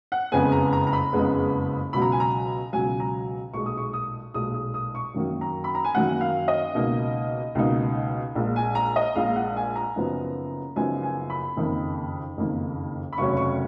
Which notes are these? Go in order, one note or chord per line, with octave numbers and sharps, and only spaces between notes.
F#5
F#1 F2 C#3 G#3 B3 G#5
A#5
A#5
A#5
B5
F#1 F2 C#3 G#3 B3
C#2 B2 F#3 B5
A#5
G#5
A#5
C#2 B2 F#3 G#5
A#5
B1 A#2 G#3 C#6
D#6
C#6
D#6
B1 A#2 G#3 D#6
D#6
D#6
C#6
F#2 D#3 F#3 A#3
A#5
B5
A#5
G#5
F#2 D#3 F#3 A#3 F#5
F5
D#5
C#2 B2 A#3 D#4
C#2 B2 A#3 D#4
A#1 A#2 G#3
G#5
A#5
D#5
A#1 A#2 G#3 F5
F#5
G#5
A#5
F#1 F#2 F3 B3 D#4
F#1 F#2 F3 B3 D#4 G#5
G#5
B5
F#1 F2 D#3 A#3 D#4
F#1 F2 D#3 A#3 D#4
B5
F1 D#2 C#3 F#3 C#4 C#6
C#6